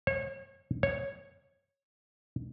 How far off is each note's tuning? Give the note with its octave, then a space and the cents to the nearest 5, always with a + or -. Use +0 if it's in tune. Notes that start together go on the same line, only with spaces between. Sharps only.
C#5 -35
C#5 -10